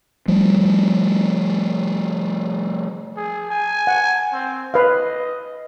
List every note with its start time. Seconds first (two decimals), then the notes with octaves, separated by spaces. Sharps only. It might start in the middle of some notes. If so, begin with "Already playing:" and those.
0.28 F3 G3 A3
3.17 G#4
3.50 G#5
3.87 F#5
4.33 C4
4.74 B4 D#5 F5